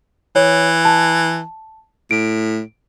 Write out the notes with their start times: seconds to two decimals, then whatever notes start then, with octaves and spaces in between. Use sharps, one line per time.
0.36 E3 C#5
0.85 A5
2.11 A2 D7